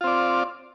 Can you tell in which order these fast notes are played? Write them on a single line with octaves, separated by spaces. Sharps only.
F4 C4 D5